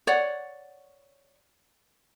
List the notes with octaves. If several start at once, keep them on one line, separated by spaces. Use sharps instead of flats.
C#5 D5 F#5